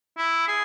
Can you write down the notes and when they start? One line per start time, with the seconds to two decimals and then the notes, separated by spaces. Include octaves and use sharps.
0.17 E4
0.48 G#4